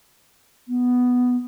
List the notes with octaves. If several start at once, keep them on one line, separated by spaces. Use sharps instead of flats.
B3